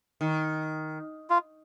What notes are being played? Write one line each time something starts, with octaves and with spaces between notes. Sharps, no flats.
D#3
F4